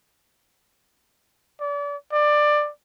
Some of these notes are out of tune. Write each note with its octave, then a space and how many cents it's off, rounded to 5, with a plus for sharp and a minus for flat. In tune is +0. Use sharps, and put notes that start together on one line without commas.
D5 -35
D5 +15